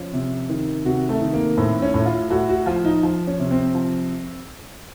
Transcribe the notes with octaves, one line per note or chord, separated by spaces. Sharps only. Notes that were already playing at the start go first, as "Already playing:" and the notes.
Already playing: F3 C#4
C3
D#3
C3 F#4
A3
D#3
A#3
A2 C4
C#4
A2
F4
A2 F#4
F#4
F3 F4
D#4
F3
C#4
C3
C4
F3